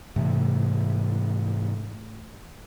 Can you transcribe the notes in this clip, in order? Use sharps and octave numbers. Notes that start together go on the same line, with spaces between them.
G#2 C3 E3 A3